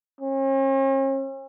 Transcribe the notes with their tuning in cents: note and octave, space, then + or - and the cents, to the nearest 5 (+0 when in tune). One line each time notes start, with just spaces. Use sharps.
C#4 -45